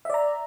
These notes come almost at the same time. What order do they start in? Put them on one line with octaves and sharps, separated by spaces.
E5 D5 A#5